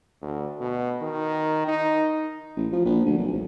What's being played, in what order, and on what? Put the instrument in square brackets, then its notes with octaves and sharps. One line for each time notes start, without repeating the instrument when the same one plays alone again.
[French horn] D2
B2
D#3
D#4
[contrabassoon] A1
F3
A#1
D2
B1
G#1